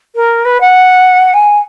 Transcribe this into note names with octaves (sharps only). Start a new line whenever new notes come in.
A#4
B4
F#5
G#5